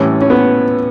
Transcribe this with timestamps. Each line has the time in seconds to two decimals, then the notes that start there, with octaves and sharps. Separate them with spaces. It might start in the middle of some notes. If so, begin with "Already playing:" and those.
Already playing: A2 E3 G3 C#4
0.21 C#4
0.30 B3